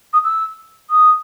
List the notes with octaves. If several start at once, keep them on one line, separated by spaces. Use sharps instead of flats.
D#6
E6
D#6